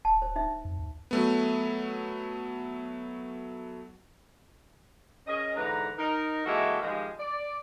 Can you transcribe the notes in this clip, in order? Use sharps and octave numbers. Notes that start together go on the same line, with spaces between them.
D1 A5
C5
D#4 E5
F2
D#2
F#3 A3 B3
C#4 G#4 A#4 D#5
G#2 D3 E3 B4 A#5
D#4 A#4
E3 G#3 A#3 F#4 A4 E5
D#3 F3 G3 G#3
D5